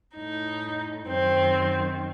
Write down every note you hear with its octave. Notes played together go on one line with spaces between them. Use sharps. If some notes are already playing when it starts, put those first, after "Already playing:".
A2 D#4
F#2 D#3 C4